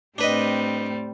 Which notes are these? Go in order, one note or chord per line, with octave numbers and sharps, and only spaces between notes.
A2 G3 C4 D4 B4 D#5